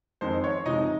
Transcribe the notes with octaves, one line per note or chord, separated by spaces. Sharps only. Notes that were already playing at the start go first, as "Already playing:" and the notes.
F2 D#3 G#3 C5
C#5
C3 F3 G#3 D#4 D#5